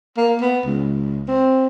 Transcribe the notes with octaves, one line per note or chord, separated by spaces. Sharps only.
A#3
B3
C#2
C4